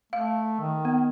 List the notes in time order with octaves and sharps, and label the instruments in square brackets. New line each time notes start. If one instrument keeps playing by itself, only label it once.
[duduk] A3 [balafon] F5
[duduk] D#3
[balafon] B3